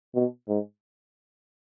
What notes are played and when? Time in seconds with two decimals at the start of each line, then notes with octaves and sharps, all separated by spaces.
0.15 B2
0.48 G#2